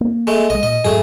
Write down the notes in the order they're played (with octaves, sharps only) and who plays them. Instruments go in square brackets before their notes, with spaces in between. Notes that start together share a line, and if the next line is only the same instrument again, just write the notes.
[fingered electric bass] A#3
[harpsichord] G#3 A3
[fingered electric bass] B1 G#3 [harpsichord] D#5
[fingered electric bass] A#2 [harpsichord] D#5
[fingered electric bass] F2 G#2 F#3 [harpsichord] A3 G#4